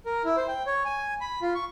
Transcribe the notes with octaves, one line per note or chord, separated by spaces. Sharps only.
A#4
E4
C5
G5
C#5
G#5
B5
F4
C#6